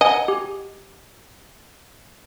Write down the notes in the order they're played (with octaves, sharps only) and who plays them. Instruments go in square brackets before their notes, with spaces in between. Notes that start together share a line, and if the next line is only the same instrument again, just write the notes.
[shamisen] D#5 [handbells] F#5 G#5
[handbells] G4